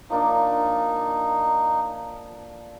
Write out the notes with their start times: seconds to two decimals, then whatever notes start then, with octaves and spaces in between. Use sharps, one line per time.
0.10 F3 A#3 D4 D#4